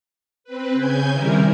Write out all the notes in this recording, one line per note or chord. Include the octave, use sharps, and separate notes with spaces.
C4 B4
C#3 G#5 G6 G#6
C3 D#3 G3 E4 A#4